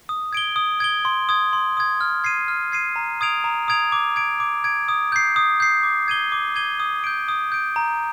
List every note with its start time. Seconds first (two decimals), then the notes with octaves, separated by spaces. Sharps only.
0.09 D#6
0.33 G#6 D7 G7
0.56 D#6
0.80 G#6 D7 G7
1.05 C6
1.29 D#6 G#6
1.53 C6
1.77 D#6 G#6
2.01 F6
2.24 G#6 C7 D#7
2.48 F6
2.72 G#6 C7 D#7
2.96 A#5
3.21 D#6 G#6 D7 F7
3.44 A#5
3.68 D#6 G#6 D7 F7
3.92 D6
4.16 G#6 D7
4.40 D6
4.64 G#6 D7
4.88 D#6
5.12 G6 C7
5.36 D#6
5.60 G6 C7
5.83 D6
6.08 G#6 D#7 G7
6.32 D6
6.56 G#6 D#7 G7
6.80 D#6
7.04 G6 D7
7.28 D#6
7.52 G6 D7
7.76 A#5